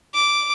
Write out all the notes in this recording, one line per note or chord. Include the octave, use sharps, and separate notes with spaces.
D6